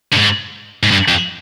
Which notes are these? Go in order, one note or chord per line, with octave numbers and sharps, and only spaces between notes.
G2
G#2
G#2
G2
F2